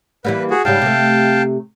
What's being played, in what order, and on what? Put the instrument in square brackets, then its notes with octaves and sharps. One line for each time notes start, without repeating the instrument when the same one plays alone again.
[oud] E3 G3 A#3 [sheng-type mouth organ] B4
[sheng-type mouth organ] F#4 G#4
[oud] G#2 C#3 G3 [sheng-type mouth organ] F5 G5 A5
[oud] C3 A3